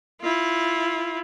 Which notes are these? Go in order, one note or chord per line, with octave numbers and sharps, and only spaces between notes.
E4 F4